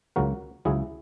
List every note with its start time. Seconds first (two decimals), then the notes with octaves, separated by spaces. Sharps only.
0.16 C#2 C#3 F#3 F#4 A#4
0.65 C#2 C#3 F#3 E4 G#4